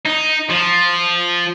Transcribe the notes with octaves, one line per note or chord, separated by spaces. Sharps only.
D#4
F3